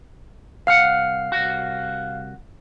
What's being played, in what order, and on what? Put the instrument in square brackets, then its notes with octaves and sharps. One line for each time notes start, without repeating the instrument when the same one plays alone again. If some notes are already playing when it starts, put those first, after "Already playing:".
[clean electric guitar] C2 F#5 [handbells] F5 F6
[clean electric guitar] C2 F#4